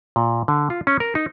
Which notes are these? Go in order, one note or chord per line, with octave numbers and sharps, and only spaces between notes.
A#2
D3
F4
C#4
A#4
D#4